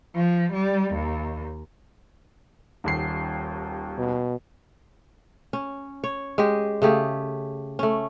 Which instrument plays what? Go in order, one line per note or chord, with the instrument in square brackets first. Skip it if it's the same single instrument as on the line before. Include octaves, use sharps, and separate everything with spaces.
[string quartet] F3
G3
D#2
[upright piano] D#1 D#2 C7
[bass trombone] B2
[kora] C#4
C#5
G#3 G4
C#3 A3 G4 G#4
A3 C#4